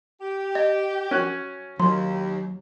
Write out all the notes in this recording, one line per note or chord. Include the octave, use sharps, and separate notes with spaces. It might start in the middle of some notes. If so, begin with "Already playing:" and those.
G4
D#5
C#4 F#4 F#6
D#2 F#3 C6